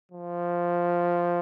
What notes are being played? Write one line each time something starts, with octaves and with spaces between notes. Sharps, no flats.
F3